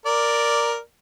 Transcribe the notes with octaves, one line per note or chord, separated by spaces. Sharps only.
A#4 D5